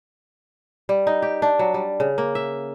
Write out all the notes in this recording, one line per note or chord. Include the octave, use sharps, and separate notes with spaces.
G3
D#4
G4
D4
F#3
G3
C#3
A#3
E5